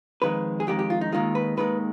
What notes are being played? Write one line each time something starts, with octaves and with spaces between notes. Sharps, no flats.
F2 D#3 G#3 B4
G#4
F2 D#3 G#3 G4
G4
F4
D#4
D#2 D#3 G#3 F4
B4
D#2 D#3 G#3 B4